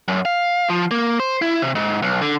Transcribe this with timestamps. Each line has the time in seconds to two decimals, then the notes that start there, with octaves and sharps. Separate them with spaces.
0.08 F#2
0.25 F5
0.70 F3
0.91 A#3
1.20 C5
1.42 E4
1.62 C3
1.75 G#2
2.02 B1
2.22 D3